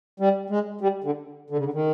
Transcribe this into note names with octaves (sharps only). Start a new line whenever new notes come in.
G3
G#3
G3
D3
D3
C#3
D3
D#3